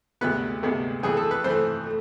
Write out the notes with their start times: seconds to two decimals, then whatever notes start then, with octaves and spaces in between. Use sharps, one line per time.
0.21 D2 C3 G#3 B3 B4
0.63 D2 C3 G#3 B3
1.03 F2 E3 A3 G#4
1.17 A4
1.31 B4
1.44 F2 E3 A3 C5
1.86 A3